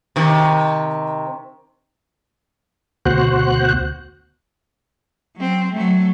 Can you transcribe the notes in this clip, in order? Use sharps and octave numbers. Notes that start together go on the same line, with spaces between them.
C3 D#3
D2 B2 F#4 C5 F#6
F#3 C4
F#3 A3